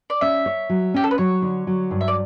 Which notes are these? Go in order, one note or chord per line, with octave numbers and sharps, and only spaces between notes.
D5
C#4 E5
C#5
F#3
C#4 G4
A4
B4
F#3 C#5
D3
F#3
G2
E5
D5